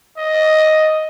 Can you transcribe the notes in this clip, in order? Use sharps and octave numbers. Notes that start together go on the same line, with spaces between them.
D#5